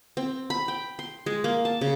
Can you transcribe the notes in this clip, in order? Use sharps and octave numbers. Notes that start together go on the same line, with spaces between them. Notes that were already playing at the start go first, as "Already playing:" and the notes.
C4
B5
G5
C6
G#3
A#3
A5
C#3